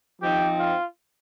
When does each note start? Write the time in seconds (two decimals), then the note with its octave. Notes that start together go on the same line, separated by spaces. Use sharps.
0.20 F3 C4 D#4 G4
0.58 F4